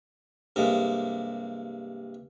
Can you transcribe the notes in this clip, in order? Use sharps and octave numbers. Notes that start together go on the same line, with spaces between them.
G2 C3 G#3 A#3